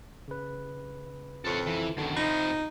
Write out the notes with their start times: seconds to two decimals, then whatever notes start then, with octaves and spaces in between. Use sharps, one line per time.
0.28 C#3 B4
1.45 F2 A4 C#5
1.67 E3
1.97 F#2 D3 D#3
2.16 C3 F3 D#4 B5 A#6